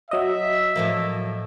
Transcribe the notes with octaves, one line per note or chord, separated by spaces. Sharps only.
F#3 D#5 E5
A2 F3 A#3